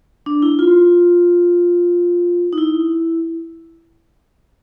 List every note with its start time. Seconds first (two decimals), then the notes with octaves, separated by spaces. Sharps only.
0.26 D4
0.42 E4
0.59 F4
2.53 D#4
2.58 E4